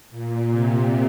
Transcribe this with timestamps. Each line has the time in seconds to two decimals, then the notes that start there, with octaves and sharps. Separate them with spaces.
0.10 A#2
0.50 C3